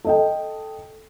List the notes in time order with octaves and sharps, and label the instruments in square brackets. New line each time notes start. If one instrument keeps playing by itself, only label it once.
[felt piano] A4 D#5 G5